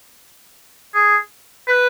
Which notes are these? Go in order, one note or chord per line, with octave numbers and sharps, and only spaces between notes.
G#4
B4